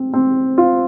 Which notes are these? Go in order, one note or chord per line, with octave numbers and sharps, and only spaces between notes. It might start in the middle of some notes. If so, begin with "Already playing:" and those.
Already playing: C4
C4
F4